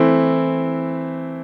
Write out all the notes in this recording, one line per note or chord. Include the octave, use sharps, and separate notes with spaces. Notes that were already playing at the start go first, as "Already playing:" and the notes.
Already playing: E3 A3 C4 E4